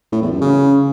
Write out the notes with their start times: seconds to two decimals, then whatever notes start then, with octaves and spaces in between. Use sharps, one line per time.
0.12 A2
0.22 E2
0.31 F#2
0.41 C#3